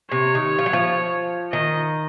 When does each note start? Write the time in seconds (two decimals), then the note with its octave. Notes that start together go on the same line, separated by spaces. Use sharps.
0.11 C3 C#5
0.35 D#3
0.59 F3
0.66 F#3
0.73 F3
1.53 D#3 D#5